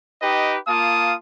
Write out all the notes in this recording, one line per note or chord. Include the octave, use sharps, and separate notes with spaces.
D#4 G4 B4 D#5 G5
A#3 F4 F5 A5 D#6